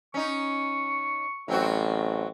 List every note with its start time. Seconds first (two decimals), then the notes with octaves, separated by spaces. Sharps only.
0.14 C#4 D#4 C#6
1.48 A1 F#3 C4 F#4